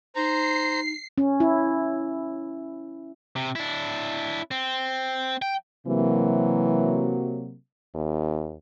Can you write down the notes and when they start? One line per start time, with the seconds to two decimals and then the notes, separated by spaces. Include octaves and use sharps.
0.16 D#4 C5 A#5 C7
1.18 C#4
1.40 E4
3.36 C3
3.55 D4 E4
4.51 C4
5.42 G5
5.87 C3 E3 F#3 A#3
7.95 D#2